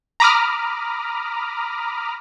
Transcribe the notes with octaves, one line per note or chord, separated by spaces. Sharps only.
A#5 B5 D6 D#6 F6